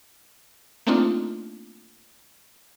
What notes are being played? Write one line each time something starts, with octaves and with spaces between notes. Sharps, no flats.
A3 A#3 C4 D4 D#4 F4